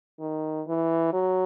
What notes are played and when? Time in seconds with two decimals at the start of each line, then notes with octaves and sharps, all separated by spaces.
0.20 D#3
0.67 E3
1.13 F#3